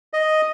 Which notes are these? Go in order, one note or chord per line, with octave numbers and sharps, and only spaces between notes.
D#5